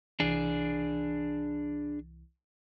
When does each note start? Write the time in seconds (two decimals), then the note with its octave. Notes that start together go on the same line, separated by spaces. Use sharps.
0.20 C2 E3 D4 G#4